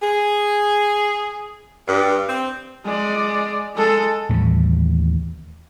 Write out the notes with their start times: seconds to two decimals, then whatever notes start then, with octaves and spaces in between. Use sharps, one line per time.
0.01 G#4
1.88 G2
2.28 C4
2.85 G#3 D5
3.76 G#3 A4
4.29 D#2 A2 E3 G3